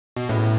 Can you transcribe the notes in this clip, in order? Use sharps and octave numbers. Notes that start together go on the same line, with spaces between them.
B2
E2 A2 C#3 E3 A3